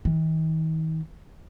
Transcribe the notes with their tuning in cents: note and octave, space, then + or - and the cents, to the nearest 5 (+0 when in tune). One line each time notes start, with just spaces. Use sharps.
D#3 +45